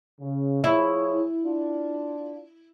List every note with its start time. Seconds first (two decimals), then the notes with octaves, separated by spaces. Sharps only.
0.20 C#3
0.64 F3 E4 G#4 C#5
1.44 D4 F4